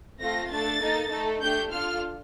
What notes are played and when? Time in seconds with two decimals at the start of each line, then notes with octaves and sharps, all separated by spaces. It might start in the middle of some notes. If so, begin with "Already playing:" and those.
0.19 A3 C4 F4 A4 A#6
0.50 A3 D4 A4 A6
0.81 A#3 D#4 A4
1.11 A3 D#4 A4
1.41 A3 D4 G4 G6
1.72 D4 F4 A4 F6